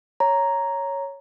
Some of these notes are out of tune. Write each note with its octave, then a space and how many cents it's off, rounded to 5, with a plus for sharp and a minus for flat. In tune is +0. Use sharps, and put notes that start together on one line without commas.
C#5 +0 A#5 +0